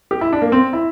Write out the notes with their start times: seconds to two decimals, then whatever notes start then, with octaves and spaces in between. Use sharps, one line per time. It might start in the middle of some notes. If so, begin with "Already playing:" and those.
0.11 G4
0.21 E4
0.33 D4
0.42 A#3
0.52 C4
0.73 E4